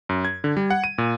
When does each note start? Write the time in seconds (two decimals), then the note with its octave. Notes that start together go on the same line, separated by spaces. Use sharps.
0.09 F#2
0.25 G#6
0.44 D3
0.57 G3
0.70 F#5
0.84 D#7
0.98 A#2